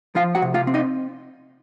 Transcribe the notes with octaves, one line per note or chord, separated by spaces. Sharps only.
F3 F4 F5
F#4 F#5
C3
F4 F5
C4
D#4 D#5